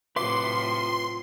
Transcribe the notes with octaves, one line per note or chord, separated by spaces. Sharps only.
A2 C3 F#3 F4 B4 E5 C6 D6